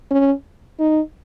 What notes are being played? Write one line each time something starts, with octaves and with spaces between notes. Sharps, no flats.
C#4
D#4